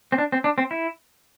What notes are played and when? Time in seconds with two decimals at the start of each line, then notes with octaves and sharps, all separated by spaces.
0.12 C4
0.18 D4
0.32 C4
0.44 D4
0.58 C4
0.71 E4